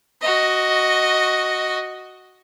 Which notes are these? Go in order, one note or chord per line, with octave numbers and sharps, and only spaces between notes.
F#4 D#5